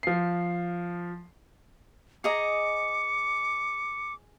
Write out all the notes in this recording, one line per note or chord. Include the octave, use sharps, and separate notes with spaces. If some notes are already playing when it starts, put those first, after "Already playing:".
F3 C7
G#4 D#5 A#5 D6 C#7